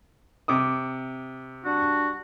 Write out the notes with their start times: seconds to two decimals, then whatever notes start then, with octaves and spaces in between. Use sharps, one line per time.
0.48 C3 D6 D#6
1.64 G3 D4 F#4